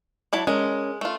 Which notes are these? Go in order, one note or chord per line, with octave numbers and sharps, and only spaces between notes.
F#3 E4 A5
G#3 C#4 A#4
A3 F4